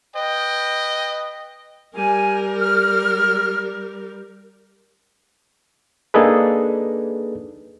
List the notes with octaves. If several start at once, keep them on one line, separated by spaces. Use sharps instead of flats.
B4 D#5 G5
G3 A#4 G#5
F6
A#3 D4 D#4 G#4 A4 B4